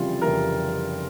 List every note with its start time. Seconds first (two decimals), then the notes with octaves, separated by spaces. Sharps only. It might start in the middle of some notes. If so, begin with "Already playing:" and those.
Already playing: F1 F2 C#3 E3 G3 F4
0.22 F1 F2 C#3 E3 G3 A#4